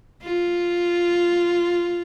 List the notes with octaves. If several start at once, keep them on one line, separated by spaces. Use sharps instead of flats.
F4